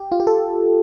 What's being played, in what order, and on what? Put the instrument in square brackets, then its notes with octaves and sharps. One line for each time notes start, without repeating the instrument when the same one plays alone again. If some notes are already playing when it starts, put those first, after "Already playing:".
Already playing: [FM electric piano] G4
F4
G4
A4